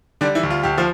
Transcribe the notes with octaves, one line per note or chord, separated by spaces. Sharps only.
D3 G3 D4
E3 E4
D2
F4
D2 G4
F3 F4